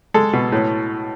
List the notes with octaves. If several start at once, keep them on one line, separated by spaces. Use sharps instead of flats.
G#3 A4
B2
A2